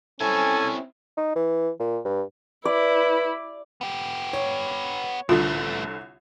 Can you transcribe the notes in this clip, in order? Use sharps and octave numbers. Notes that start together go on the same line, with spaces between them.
C4 C#4 E4 A4 G#5
D#4
E3
A#2
G2
E4 B4 D5
B3 G4
C#5
C2 D3 E3 A3 F4